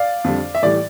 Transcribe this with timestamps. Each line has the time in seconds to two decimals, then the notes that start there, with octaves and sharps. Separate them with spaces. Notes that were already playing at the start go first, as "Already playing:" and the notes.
Already playing: D5 F5
0.24 F2 D3 G3
0.55 E5
0.63 A2 E3 G3 D5